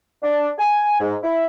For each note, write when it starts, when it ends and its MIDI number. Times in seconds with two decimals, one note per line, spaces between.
0.23 0.49 62
0.59 0.98 80
1.00 1.14 44
1.23 1.47 64